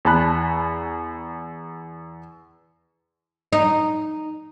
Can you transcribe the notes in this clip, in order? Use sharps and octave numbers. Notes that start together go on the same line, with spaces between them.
E2 G#5 A5 B5 F#6
D#4